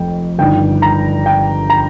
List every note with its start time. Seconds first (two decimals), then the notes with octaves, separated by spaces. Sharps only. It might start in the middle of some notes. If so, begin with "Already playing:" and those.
Already playing: F1 F2 G5
0.38 G1 G2 D#3 G5
0.82 A#5
1.26 G5
1.70 A#5